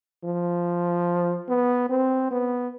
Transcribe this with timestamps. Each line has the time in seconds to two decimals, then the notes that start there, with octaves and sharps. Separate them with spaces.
0.25 F3
1.49 B3
1.89 C4
2.31 B3